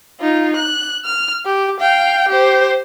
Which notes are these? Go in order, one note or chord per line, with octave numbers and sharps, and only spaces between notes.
D#4 F4
F#6
F6
G4
F5 G5
G4 C5